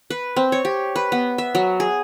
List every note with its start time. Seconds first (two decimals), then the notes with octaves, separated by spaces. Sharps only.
0.10 B4
0.36 C4
0.52 C#5
0.65 G4
0.96 B4
1.12 B3
1.38 E5
1.55 F#3
1.80 G#4